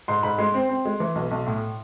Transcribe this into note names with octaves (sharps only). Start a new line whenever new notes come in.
G#2 C6
G#2 B5
G#3 C6
C4
C4
G#3
E3
B1
B1
A2